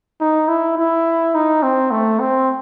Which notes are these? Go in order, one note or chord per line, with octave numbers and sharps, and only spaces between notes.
D#4
E4
E4
D#4
C4
A3
C4